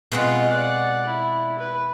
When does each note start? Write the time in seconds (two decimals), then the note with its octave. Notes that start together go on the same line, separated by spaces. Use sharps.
0.12 B2 G#3 C4 F4 F#5
0.48 D5 F#5
1.07 E4
1.59 B4